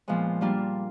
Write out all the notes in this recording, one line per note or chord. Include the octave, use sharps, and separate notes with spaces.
A#2 F3 G#3 B3
G3 A#3 D4 F4 A#4